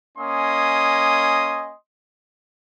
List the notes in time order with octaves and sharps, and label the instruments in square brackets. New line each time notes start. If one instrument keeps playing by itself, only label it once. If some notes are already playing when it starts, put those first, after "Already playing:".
[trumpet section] A#3 C#4 D#5 G#5 C6 D#6